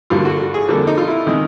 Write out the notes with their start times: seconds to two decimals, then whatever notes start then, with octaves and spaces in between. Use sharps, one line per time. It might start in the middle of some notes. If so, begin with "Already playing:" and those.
0.10 G2 D3 G3 A#3 F4
0.25 F#4
0.39 F#4
0.54 G#4
0.68 F2 D3 G3 A#3 A4
0.87 D#4
0.98 F4
1.07 E4
1.27 C3 D#3 G#3